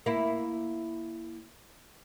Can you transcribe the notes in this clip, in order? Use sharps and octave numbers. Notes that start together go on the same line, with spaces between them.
A#3 E4